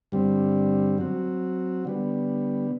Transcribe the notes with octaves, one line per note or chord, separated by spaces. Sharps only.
G2 D3 G3 C4
F#3 C4 F#4
D3 G3 B3